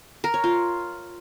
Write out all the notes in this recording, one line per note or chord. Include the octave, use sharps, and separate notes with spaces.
A#4
C#5
F4